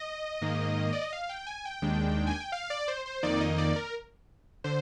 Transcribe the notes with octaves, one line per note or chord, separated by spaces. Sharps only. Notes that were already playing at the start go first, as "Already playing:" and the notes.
Already playing: D#5
G#2 D#3 A#3
D5
D#5
F5
G5
G#5
G5
D#2 D#3 G#3 D4
G#5
G5
F5
D5
C5
C5
F2 D#3 A#3 D#4 D5
D#5
D5
A#4
D3 C5